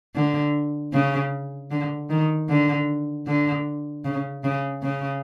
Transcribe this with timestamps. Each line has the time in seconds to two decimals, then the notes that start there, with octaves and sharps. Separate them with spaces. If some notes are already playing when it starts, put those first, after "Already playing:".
0.15 D3
0.93 C#3
1.71 D3
2.10 D#3
2.49 D3
3.27 D3
4.05 C#3
4.44 C#3
4.83 C#3